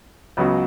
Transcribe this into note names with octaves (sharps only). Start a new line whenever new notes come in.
C#2 C#3 F#3 B3 F#4